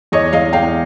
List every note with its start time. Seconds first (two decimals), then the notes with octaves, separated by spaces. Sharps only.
0.12 E2 C#5 D#5
0.32 E2 D#5 F5
0.53 E2 F5 G5